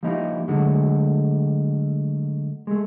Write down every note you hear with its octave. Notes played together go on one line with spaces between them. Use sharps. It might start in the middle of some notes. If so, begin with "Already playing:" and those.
F3 G3 A#3 D#4 E4
D3 F#3 G#3 A3
G#3 A3